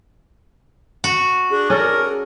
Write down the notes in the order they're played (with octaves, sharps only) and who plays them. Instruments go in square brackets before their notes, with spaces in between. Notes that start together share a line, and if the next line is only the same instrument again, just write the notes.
[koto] F#4
[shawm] D4 [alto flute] G#4
[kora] C#4 A4 D5 [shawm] A#4